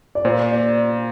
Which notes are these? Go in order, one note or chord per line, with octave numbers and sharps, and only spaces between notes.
D5
A#2 C5
D5